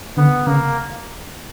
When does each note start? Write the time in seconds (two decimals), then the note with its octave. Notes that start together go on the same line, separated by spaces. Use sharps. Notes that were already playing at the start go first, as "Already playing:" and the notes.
0.17 D3 B3
0.47 C#3 A#3